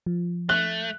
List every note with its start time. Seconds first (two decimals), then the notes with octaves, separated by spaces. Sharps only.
0.06 F3
0.49 A3 F#6